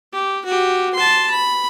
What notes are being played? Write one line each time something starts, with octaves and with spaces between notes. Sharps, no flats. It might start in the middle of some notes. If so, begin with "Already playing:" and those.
G4
F#4 G4
A5 C6
B5